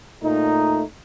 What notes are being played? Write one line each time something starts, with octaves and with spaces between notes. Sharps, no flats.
A#2 A3 D#4